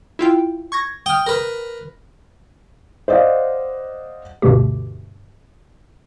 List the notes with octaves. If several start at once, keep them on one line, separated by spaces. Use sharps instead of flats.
E4 F4 G5
C#6 G#6 A#6
G5 D#6 F6
A#4 B4
C5 D5 D#5 F5 F#5
D2 G2 B2 D3 A3 G4